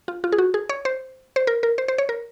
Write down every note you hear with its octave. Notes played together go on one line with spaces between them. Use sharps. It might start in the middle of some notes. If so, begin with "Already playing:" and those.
F4
F4
G#4
F#4
G#4
C#5
C5
C5
A#4
A#4
C5
C5
C#5
A#4